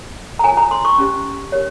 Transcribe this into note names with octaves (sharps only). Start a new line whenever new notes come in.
A#5
F4 A#4 C#5 G#5
A#5
C6
C#6
C#4 G4 C5
G4 A#4 C#5